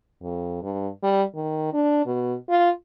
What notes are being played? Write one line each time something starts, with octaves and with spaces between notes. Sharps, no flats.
F2
G2
G3
D#3
D4
B2
F4